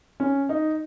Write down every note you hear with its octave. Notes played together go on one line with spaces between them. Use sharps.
C#4
D#4